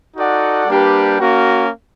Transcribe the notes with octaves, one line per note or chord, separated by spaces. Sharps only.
D#4 F#4 A4 D5 F#5
G3 A#3 D4 G4 B4
A#3 C#4 F#4